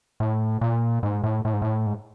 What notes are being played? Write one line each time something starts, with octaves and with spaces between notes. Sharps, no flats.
A2
A#2
G#2
A2
A2
G#2
A2
G#2